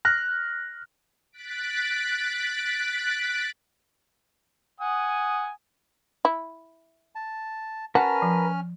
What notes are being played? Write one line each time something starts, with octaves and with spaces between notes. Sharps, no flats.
F6 F#6 A#6
F#6 A6 B6 D7
F#5 G#5 D#6
E4
A5
C#4 F#4 A#4 B4 A5 F6
F3